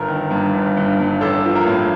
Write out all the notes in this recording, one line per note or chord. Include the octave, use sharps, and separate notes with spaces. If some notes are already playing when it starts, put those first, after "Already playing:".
Already playing: G1 A#4
D#3
G2
G1
G2
G2
A1 A4
F3
A#4
A2